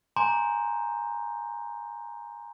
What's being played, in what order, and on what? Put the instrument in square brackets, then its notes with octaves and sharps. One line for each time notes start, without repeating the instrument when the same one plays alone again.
[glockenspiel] G#5 A#5 C6 D6 G6